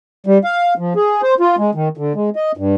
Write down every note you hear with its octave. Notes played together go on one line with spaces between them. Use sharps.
G3
F5
F3
G#4
C5
F4
G#3
D#3
D3
G#3
D#5
G2